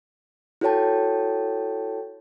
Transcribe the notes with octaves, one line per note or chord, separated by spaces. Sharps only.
E4 F#4 A4 C#5 G5 A5